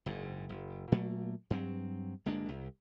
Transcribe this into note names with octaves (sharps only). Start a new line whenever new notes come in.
F#1 G#2
F#1
A#2 F#3 A3 A#3
G2 F#3 C4
G1 G#3 A#3 D4
C2